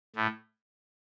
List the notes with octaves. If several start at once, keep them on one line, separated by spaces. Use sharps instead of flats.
A2